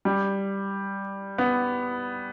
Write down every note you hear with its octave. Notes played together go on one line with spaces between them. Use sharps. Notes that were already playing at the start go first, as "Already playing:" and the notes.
G3
B3